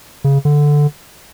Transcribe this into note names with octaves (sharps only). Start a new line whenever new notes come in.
C#3
D3